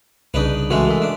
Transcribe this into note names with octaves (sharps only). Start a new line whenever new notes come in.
C2 C#3 D4 D#4 B4
E3 G#3 A3 F#4
A#4 E5
D4